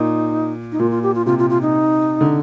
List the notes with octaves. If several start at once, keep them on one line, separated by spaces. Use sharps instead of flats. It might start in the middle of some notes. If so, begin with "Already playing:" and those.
Already playing: A#2 D#4
D#4
A#2 F4
F4
G4
F4
C3 F4
F4
F4
D#4
D3